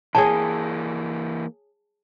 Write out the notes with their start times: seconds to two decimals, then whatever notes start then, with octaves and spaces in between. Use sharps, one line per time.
0.15 E3 A#3 G#4 C#5 G5 A5